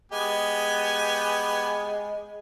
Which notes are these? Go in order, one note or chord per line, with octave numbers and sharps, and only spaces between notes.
G#3 B3 G4 G#5